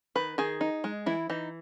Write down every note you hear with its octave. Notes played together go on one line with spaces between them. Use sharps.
D#3 B4
D#3 G#4
D#4
G#3
E3 E4
E3 D#4